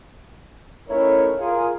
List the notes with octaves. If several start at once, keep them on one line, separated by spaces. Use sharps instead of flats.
A3 C#4 D#4 E4 A#4 C#5
F4 G#4 A#4